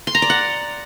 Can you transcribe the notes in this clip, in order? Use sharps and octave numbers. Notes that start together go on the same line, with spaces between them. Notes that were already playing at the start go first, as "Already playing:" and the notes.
C6
A#5
D5
F#5